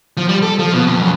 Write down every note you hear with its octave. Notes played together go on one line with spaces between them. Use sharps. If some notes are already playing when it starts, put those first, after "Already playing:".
F3
G3
A4
F3
B2
F2
F#2